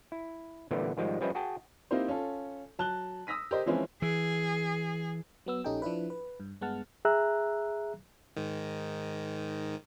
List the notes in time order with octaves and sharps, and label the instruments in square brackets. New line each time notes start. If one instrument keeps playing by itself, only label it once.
[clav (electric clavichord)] E4
A#2 D3 E3 G3 A3 B3
G#2 D#3 F3 G3 G#3
F3 G3 C#4 B4 D#5 E5
F#4 G#4 G5 A5
[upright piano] A#3 C4 D#4 E4 G4 C5
C#4 F4 A4
F#3 A5 F#6 G7
D#6 E6 A#6 B6 D#7
G4 A#4 C5 D#5
E3 F3 G#3 C4 C#4 E4
[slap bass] E3 [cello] G#4
[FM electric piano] F#3 B3 E6
A#1 C#4 D#4 G4 A4 G5
F3 D4 E4 B4
B4
G2
G2 G#3 B3 F#5 A5 F6
[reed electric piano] G#4 E5 A#5 E6 F#6
[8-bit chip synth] G#2 D#3